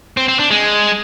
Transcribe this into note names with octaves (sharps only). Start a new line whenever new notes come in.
C4
C4
D4
G#3